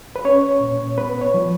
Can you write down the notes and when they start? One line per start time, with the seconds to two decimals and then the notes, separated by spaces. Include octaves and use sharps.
0.16 B4
0.25 C#4 C#5
0.61 A#2
0.98 B3 B4
1.21 C#5
1.34 F3